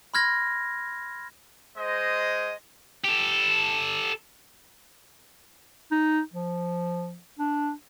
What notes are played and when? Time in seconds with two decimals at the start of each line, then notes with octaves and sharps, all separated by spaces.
0.14 B5 C6 F6 G#6 A#6
1.77 G#3 C5 D#5
3.04 G4 A4
5.91 D#4
6.34 F3
7.39 D4